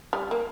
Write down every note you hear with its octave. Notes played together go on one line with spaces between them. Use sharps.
G3
A#3